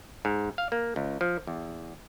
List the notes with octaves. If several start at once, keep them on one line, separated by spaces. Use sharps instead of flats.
G#2
F5
A#3
C#2
F3
E2